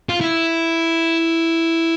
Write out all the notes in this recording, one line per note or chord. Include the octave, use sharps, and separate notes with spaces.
F4
E4